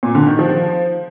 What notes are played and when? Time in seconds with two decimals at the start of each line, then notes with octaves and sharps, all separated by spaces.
0.03 A#2
0.15 D3
0.27 D#3
0.39 F3